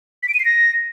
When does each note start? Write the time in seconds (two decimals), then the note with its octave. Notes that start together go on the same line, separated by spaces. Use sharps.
0.23 B6
0.28 D7
0.34 D#7
0.40 C7
0.45 A#6